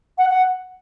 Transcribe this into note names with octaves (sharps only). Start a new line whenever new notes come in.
F#5
F#5